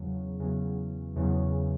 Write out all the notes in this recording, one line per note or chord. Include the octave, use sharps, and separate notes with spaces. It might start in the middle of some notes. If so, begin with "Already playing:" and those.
Already playing: E2 C#3 F#3
E2 C#3 F#3
E2 C#3 F#3